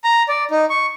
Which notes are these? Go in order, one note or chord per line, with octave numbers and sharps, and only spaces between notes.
A#5
D5
D#4
C#6